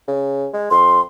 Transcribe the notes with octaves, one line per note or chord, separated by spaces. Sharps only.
C#3
G#3
F2 C6